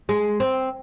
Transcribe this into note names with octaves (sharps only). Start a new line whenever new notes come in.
G#3
C4